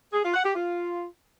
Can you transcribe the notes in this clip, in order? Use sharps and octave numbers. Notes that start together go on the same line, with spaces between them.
G#4
F4
F#5
G4
F4